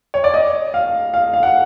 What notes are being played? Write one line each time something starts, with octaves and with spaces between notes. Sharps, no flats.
C#5
D5
D#5
F5
F5
F5
F#5